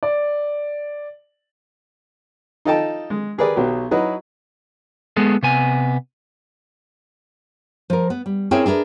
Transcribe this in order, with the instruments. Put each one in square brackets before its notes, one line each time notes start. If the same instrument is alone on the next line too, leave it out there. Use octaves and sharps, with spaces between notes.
[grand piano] D5
[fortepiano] D#4 F4 A4 D#5 G5 A5
G#3
G4 G#4 A#4 B4 D5
B1 F#3 B3 G4
F#3 D#4 E4 F#4 B4 D#5
[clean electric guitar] G#3 B3 G#4 A4
C3 B3 G#5
[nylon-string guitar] F3 A#4
B3
G3
C4 C#4 E4 G#4 A#4 G5
D4 G#4 A#4 B4